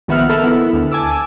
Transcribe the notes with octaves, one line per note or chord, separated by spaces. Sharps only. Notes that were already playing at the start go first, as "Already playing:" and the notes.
A#1 D#3 B3 E5 F#5 F6
A4 A#4 E5 B5 F6
B3 E4
D2
G#5 A5 D6 E6